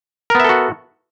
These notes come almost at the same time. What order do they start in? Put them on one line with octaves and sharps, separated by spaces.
A#4 B3 E5 A4 F#4